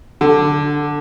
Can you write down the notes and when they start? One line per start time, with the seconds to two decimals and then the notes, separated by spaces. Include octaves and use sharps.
0.21 D3